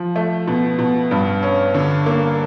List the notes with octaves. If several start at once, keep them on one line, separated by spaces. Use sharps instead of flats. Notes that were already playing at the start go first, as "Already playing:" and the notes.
Already playing: F3
A3
B2
B2
G2
C#4
D3
A#3